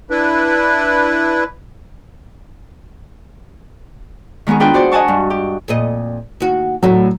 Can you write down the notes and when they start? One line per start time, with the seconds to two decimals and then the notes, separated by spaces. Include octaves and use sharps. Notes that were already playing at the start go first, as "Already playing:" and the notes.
0.10 D4 E4 B4
4.47 D#3 G#3 B3 C#4 G#4
4.60 D4 F4 G#4 B4 G5
4.74 F#4 C5 D5 F#5
4.91 D#5 F#5 G#5 A5 C#6
5.08 G2
5.30 G4
5.68 F2 A#2 D#5
6.40 D#2 F#4
6.83 D2 A2 F#3